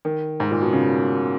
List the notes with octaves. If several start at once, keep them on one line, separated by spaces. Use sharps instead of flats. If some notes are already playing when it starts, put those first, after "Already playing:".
D#3
G#2
A#2
B2
C#3